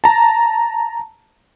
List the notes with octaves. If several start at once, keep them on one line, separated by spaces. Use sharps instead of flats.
A5 A#5